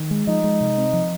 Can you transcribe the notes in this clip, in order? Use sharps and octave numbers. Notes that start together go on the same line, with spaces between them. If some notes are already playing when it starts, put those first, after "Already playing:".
Already playing: D#3
G#3
F3 D#4
G#3
C3
C4
F3